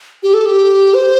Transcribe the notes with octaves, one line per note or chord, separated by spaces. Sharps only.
G4
A4
G4
C5